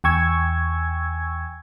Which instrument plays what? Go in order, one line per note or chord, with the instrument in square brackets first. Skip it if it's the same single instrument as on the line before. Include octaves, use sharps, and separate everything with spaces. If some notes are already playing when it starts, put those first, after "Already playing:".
[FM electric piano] E2 G5 G#5 C#6 E6 G#6